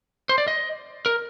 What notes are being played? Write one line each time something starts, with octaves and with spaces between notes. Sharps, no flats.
C5
D5
D#5
A#4